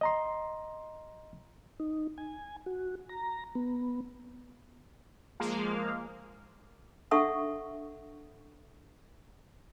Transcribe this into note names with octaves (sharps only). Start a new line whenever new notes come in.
D#5 A#5 C6
D#4
G#5
F#4
A#5
B3
F3 G#3 A#3 F5
D4 A4 E5 F#5 C#6 D#6